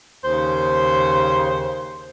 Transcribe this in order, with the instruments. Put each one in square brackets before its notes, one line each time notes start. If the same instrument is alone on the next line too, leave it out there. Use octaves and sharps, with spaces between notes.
[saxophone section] D#2 C#3 C5